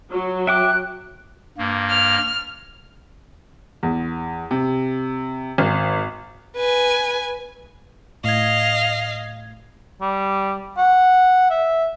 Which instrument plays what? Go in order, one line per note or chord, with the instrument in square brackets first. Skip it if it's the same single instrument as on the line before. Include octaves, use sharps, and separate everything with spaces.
[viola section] F#3
[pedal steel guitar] E5 G5 D6 [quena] F#6
[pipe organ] G2 A#3
[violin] F6 F7
[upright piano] E2
C3
G#1
[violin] B4 G#5
[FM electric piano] A2 G#6 [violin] D#5 F5
[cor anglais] G3
F#5
E5